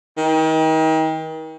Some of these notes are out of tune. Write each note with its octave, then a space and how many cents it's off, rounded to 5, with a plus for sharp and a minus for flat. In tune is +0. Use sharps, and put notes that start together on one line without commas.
D#3 +35